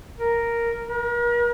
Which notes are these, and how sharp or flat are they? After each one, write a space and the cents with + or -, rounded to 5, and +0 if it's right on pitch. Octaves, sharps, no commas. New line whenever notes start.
A#4 +0
A#4 +40